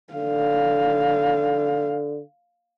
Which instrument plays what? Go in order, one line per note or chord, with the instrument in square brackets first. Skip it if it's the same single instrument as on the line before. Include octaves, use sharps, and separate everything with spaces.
[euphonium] D3 [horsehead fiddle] F5